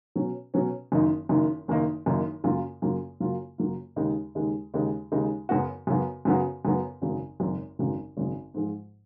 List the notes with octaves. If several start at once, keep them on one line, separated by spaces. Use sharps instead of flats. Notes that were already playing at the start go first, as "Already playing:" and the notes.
B2 F#3 C#4
B2 F#3 C#4
F#1 F#2 D#3 A#3 D#4
F#1 F#2 D#3 A#3 D#4
F#1 F#2 D#3 A#3 D#4
F#1 F#2 D#3 A#3 D#4
F#2 C#3 F#3 A#3 F4
F#2 C#3 F#3 A#3 F4
F#2 C#3 F#3 A#3 F4
F#2 C#3 F#3 A#3 F4
D#2 C#3 G#3 D#4
D#2 C#3 G#3 D#4
D#2 C#3 G#3 D#4
D#2 C#3 G#3 D#4
F#2 C#3 F#3 B3 F#4
F#2 C#3 F#3 B3 F#4
F#2 C#3 F#3 B3 F#4
F#2 C#3 F#3 B3 F#4
G#1 F#2 C#3 F#3
G#1 F#2 C#3 F#3
G#1 F#2 C#3 F#3
G#1 F#2 C#3 F#3
G#2 F3 G#3